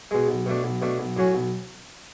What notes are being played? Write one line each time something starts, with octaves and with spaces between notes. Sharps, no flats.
B2 G#3
B1
B2 A3 D4
B1
B2 A3 D4
B1
A2 F#3 C#4 F#4
B1